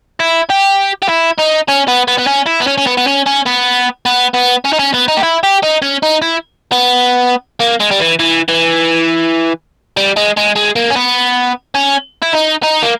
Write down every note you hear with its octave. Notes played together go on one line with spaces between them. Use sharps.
E4
G4
G4
E4
D#4
C#4
B3
B3
B3
C#4
E4
B3
C#4
C#4
B3
B3
C#4
C#4
B3
B3
B3
C#4
D#4
C#4
B3
D#4
G4
E4
G4
D#4
C#4
D#4
E4
B3
A#3
G#3
G3
E3
E3
E3
G3
G#3
G#3
G#3
A#3
C#4
B3
C#4
E4
D#4
D#4
A#3